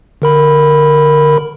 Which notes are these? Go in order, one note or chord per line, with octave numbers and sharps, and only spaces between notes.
D3 A#4 B5